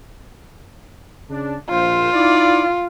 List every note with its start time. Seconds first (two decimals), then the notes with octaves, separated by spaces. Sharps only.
1.30 C#3 D4
1.70 A#1 F4 C5
2.13 D#4 E4 D5